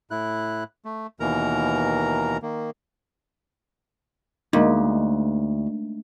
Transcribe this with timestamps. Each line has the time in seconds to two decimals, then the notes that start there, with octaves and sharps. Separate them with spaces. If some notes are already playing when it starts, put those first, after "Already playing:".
0.11 A2 E4 F#6
0.85 A3
1.20 D#2 B2 E3 A#4 A#5
2.42 D#3 A#3
4.53 D2 G#3 A#3 D#4